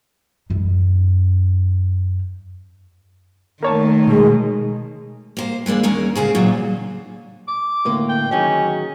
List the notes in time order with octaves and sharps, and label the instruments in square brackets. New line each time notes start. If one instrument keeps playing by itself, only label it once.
[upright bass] F#2 D#4
[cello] D#3 A3 [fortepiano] A#3 C#5 A5
[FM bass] B2 [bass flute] G#3
[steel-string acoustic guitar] A#3 C5
E3 G#3 A#3 D4
D#2 G#3 C#4 A#4
D2 C#3 G#4 C5
E2 A#2 F#3 C#4 D4
[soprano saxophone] D6
[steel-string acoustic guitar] A2 D3 A#3
[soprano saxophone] G5
[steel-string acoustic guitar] D#3 F#3 G#4 [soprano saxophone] C#4